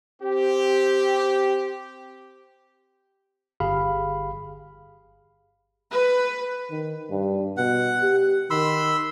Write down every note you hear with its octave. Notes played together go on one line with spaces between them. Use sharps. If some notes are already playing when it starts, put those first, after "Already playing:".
C4 G4
G1 G4 G#4 F5 B5
B4
D#3
G2
B2 F#5
G4
D#3 B5 C6 E6